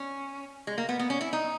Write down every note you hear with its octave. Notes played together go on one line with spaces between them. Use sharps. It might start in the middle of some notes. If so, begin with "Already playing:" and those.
Already playing: C#4
G#3
A#3
B3
B3
C#4
E4
D#4